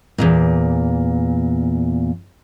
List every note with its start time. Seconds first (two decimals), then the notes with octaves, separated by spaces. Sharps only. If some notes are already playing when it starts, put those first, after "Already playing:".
0.18 E2 G2 A#2